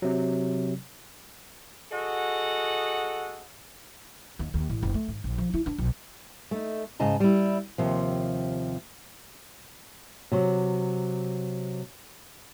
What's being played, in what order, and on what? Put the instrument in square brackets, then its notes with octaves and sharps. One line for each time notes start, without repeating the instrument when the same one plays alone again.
[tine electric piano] C3 F#3
[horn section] F#4 G#4 A4 D#5 F#5
[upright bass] D#2
D#2
A1
F#1
A3
G#1
A#1
F3
E4
D4
B1
[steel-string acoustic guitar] A3 D#4
G#2 C#3 D#5 A5 A#5
G3 E4
D#2 C3 F3
[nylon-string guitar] C3 F#3